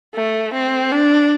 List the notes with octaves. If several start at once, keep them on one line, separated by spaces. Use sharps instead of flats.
A3
C4
D4